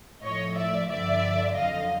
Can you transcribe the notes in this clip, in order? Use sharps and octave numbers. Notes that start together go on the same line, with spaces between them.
A2 F3 C#5 D#5
D5 E5
G2 D3 F3 D5 E5
F2 D3 F#3 D#5 F5